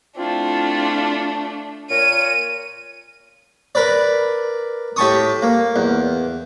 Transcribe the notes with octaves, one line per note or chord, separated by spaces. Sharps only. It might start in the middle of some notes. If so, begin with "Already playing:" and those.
A3 C4 D4 E4 F4
A#2 A#4 C#5 D#7
A#4 B4 D5
A2 G4 A5 C#6 D#6
A#3
E2